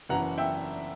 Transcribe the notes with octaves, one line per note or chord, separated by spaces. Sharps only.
F#1 F#2 E3 F#5 A#5
E5 G5